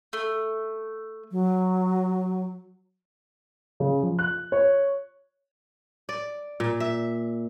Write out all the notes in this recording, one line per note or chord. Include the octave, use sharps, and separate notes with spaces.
A3
F#3
C#3
F3
F#6
C#5
D5
A#2
E5